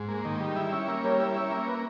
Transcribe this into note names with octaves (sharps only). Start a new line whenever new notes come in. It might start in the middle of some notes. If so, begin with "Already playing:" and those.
Already playing: G#2
A#3
D#3
G3
E4
C#4
A#3
G3 A#4 C#5
E4
C#4
A#3
B4